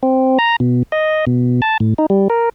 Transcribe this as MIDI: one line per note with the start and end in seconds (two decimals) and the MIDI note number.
0.03 0.38 60
0.39 0.56 82
0.60 0.83 47
0.92 1.25 75
1.27 1.61 47
1.62 1.77 81
1.80 1.94 45
1.98 2.06 63
2.10 2.28 55
2.30 2.49 70